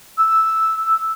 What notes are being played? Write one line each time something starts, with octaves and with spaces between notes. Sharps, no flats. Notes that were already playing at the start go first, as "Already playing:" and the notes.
E6